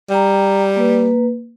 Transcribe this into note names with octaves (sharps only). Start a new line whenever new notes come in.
G3 G5 A#5
A#3 B4